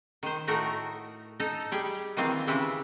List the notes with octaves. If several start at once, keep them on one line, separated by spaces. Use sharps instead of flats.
D#3 C5
A2 A3 D#4 F#4 A#4
D#4 A4 A#5
G3 G4 G#4
D#3 E3 A#3 C4 F4
C#3 E3 G#3 E4 G4